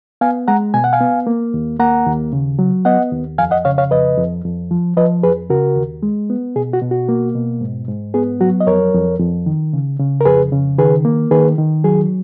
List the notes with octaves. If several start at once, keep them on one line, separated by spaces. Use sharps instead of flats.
B3 F5 G#5
G#3 F#5 A#5
B2 G#5
F#5
F5 G#5
B3
A#3
D#2
A#3 F#5 A#5
D#2
C#3
F#3
B3 D#5 F#5
D#2
F2 F5 G#5
D#5 F#5
C#3 C#5 F5
C#5 F5
F2 B4 D#5
F2
F2
F3
F3 B4 D#5
F2 G#4 B4
C#3 F#4 A#4
D#2
G#3
B3
B2 G#4
F#4
B2
F#4
A#3
B2
G#2
G#2
B3 G#4
F#3 F#4
D#5
F2 A#4 C#5
F2
F2
D#3
C#3
C#3
A#4
F2 G#4 B4
C#3
D#3 G#4 B4
A#3
D#3 G#4 B4
D#3
F#3 G#4